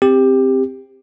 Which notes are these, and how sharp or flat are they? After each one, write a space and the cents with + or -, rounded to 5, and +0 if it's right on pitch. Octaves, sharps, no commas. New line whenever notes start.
C4 +0 G4 +15